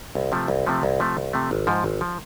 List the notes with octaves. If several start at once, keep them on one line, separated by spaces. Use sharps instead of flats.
C2
C3 F3 A3
C2
C3 F3 A3
C2
C3 F3 A3
C2
C3 F3 A3
G#1
G#2 F3
G#1
F3